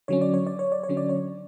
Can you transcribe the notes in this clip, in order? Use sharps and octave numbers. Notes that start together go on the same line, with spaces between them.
D3 F#3 C#4 C#5
D5
C#5
D5
C#5
D5
C#5
D3 F#3 C#4
D5
C#5